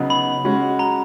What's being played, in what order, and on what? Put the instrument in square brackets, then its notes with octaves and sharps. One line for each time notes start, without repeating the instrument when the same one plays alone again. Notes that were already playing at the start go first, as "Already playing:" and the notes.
Already playing: [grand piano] C#3 F#3 B3 D#4 F#4
[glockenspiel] B5
[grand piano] G#3 C#4 F#4
[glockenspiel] A#5